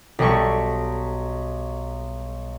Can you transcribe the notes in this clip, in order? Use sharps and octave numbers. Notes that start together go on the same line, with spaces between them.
B1 G3 A4 C#6